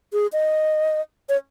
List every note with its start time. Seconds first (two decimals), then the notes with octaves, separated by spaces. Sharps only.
0.13 G#4
0.33 D#5
1.29 C#5